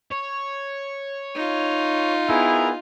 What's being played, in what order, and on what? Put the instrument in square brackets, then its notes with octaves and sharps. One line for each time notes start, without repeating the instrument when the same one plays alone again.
[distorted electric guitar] C#5
[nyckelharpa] D#4 F4
[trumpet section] B3 E4 G#4 [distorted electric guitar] A#4